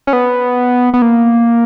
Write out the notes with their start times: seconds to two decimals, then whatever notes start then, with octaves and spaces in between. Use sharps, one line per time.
0.07 C#4
0.13 B3
0.94 B3
1.02 A#3